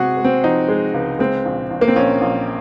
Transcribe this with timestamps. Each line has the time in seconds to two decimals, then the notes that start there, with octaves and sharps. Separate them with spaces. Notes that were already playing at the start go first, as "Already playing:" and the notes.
Already playing: C3 G#3 F#4 G#4
0.17 G#3
0.25 C4
0.44 F3 D#4
0.68 G#3
0.94 C#2
1.19 G#3 C4
1.45 A#1
1.71 A#1
1.81 A#3
1.88 C4
1.95 A#1 C#4
2.21 A#1